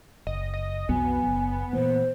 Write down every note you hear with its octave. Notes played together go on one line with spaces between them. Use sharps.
F#1 D#5
D#5
B1 F2 F#3 B3 G#5
F#1
A#2 E3 A#3 C5